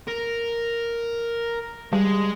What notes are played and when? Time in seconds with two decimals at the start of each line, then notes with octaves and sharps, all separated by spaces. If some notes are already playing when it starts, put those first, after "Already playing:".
0.07 A#4
1.93 G3 G#3